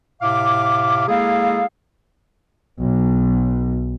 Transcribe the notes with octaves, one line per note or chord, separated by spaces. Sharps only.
A2 C3 E5 F5 D6
G#3 A#3 E4 G#4 A4 F5
B1